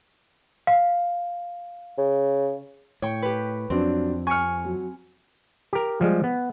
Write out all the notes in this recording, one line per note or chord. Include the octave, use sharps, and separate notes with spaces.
F5
C#3
A2 C#5 G5 C#6
G4 B4
F2 F#3 C4 D4
G#5 C#6 F6 C#7
F#3
G4 A#4
F3 G3 G#3
B3